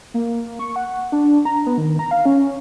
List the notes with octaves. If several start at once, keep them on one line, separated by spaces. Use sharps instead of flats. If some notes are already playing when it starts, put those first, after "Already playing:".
A#3
C#6
F#5
D4
A#5
B3
D#3
A#5
F5
C#4